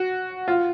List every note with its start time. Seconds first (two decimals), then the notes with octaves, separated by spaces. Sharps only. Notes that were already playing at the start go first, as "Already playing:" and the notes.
Already playing: F#4
0.48 F4